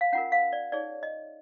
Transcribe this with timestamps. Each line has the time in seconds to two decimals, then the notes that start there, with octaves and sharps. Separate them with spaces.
0.01 F5
0.13 C#4 F4 A#4 F#5
0.32 F5
0.53 D5
0.72 D#4 G#4 C#5 D5
1.03 D#5